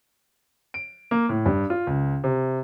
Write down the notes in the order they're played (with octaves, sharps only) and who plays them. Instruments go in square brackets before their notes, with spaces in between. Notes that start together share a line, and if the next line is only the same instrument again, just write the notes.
[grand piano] D7
A#3
A2
G2
F4
C#2
C3